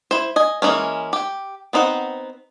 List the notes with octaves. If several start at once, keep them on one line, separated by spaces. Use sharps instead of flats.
E4 C5
D#5 G#5
E3 F#3 G#3 A#3 C#4
G4 G5
B3 C4 D#4 C5 F#5